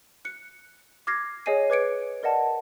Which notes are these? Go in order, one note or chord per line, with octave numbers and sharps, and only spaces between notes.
F#6 C#7
D6 F6 G#6 A#6 C7
G#4 C#5 D#5 G#5 C7 D#7
B4 D6 G#6 C#7 D7
A#4 D5 D#5 F#5 A5